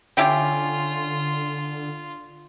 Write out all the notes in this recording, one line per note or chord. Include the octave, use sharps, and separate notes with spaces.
D3 C#4 E4 F4 G4 G5